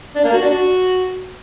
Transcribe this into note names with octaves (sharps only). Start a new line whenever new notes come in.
D4
A#3
F#4
D4
F#4